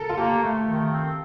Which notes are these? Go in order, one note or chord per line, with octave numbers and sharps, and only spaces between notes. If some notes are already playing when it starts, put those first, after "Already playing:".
Already playing: A4 A#4
F4
A#3 G4
A3
D#3
C4